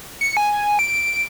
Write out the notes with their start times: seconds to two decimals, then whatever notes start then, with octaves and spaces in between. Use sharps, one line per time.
0.21 C#7
0.37 G#5
0.79 D7